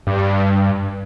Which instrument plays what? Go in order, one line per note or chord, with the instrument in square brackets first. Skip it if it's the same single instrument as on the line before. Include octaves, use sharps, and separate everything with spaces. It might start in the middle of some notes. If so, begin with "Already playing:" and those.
[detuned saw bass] G2